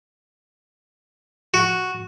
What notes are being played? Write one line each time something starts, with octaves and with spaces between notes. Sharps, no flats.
F#4